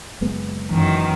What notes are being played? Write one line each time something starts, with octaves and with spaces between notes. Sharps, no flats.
F#1 G#3 B3
F#2 D#3 E3